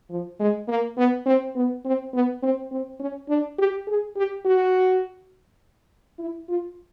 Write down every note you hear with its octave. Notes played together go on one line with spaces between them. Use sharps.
F3
G#3
A#3
B3
C4
B3
C4
B3
C4
C4
C#4
D4
G4
G#4
G4
F#4
E4
F4